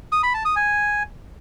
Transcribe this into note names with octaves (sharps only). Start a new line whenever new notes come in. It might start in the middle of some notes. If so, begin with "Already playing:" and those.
D#6
B5
A5
D#6
G#5